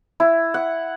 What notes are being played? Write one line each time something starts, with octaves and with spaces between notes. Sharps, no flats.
E4
F#5